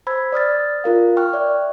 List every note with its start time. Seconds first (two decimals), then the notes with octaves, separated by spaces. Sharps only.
0.07 C5 B5 E6 G#6
0.32 D5 D#6 F6 A6
0.84 F4 A#4 F5
1.17 G5 C#6 F6 F#6
1.33 D5 E5